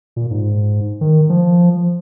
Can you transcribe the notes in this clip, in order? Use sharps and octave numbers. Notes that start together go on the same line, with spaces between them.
A#2
G#2
D#3
F3